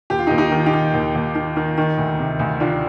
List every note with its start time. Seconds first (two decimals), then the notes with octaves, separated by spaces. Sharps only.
0.10 D#2 G4
0.19 F4
0.27 D#4 G4
0.31 D#2
0.38 D#4 G4
0.52 D#3
0.66 D#4 G4
0.74 D#3
0.94 D#2
1.15 D#2
1.35 D#3
1.56 D#3
1.78 D#3
1.98 D2
2.19 C3
2.39 D2
2.60 D#3 D4 F4